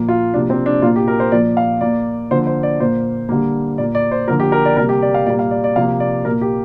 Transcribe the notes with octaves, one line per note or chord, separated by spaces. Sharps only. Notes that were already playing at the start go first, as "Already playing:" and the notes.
Already playing: A#2 F3 A#3
F4
C3 F3 A#3 D4
C4
D4
A#2 A#3 F4
G4
A#4
C5
A#2 F3 A#3 D5
F5
A#2 A#3 D5
D3 F3 A#3 C5
C5
D5
A#2 A#3 C5
D3 G3 A#3
A#2 A#3 D5
D5
C5
D3 F3 A#3 A#4
G4
A#4
D5
C3 G3 A#3 A#4
G4
D5
F5
A#2 G3 A#3 D5
F5
D5
D5
C3 F3 A#3 F5
D5
A#2 A#3 A#4
G4